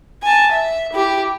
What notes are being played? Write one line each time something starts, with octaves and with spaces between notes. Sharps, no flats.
G#5 A5
E5
E4 G4